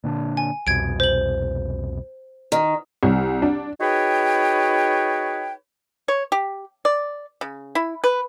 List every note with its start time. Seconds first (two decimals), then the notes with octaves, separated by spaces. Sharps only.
0.04 A#2 D3 D4
0.37 G#5
0.67 C2 F2 B2 G#6 D7
1.00 C5 F#7
2.52 D#3
3.03 C2
3.42 D4
3.81 D#4 F#4 G#4 B4 C#5 G5
6.08 C#5
6.32 G4
6.85 D5
7.41 C#3
7.75 E4
8.04 B4